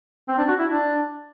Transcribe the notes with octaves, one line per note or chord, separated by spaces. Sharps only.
C4
D4
F#4
E4
D4